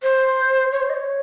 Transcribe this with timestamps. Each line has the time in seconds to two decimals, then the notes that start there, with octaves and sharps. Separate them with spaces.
0.03 C5
0.72 C#5
0.81 C5
0.89 D#5
0.94 C#5